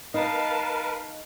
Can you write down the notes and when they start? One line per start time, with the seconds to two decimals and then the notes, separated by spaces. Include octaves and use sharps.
0.14 D#4 A#4 B4 D#5 F5 A5